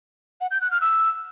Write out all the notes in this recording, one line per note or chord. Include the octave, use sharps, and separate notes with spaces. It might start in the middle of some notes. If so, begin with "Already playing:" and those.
F#5
G6
F#6
F6
E6